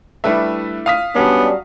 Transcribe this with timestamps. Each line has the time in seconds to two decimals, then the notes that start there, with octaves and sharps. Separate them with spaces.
0.24 G3 A3 D4 E4 B4 E5
0.86 F5 D#6 B6
1.15 F#3 G3 B3 C#4 D4 F#4